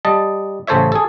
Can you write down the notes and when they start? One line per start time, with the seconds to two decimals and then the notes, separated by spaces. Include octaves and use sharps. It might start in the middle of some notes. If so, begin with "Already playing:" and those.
0.05 G3 D#5 A5
0.67 A1 C#3 A4 C5 C#5 E5
0.92 G#4 A4